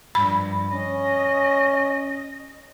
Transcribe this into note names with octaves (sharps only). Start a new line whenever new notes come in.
G2 F3 B5
C#4 D#5